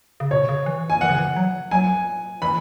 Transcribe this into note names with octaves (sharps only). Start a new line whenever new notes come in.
C#3
B2 C#5
C#3
E3
G#5
E3 F#5
C#3
E3
F#3
F#3 G#5
E3 B5